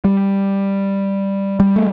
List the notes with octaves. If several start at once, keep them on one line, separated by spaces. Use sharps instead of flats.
G3
G3
A3